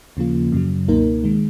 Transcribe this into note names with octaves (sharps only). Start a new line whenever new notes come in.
D#2 C#3 F3 A#3 F4
F#2 C#3 F#3
C#2 B2 A#3 D#4 A#4
D#3 G#3